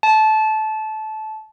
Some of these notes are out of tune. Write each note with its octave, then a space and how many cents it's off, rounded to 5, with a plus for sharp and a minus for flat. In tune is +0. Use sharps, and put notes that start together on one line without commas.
A5 -20